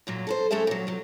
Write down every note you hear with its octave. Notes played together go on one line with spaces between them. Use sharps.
F#2 A#2 F#3
A4 B4 C5
F#2 A3 C#4 G#4 A4 E5
A#2 F#3
C3 F#3